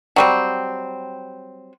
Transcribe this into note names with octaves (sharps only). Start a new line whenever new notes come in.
F#3 G3 C4